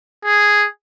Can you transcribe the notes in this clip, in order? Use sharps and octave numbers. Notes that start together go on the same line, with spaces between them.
G#4